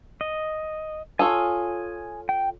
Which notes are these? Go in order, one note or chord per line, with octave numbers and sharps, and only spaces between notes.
D#5
F4 A4 C#5 G#5 D#6
G5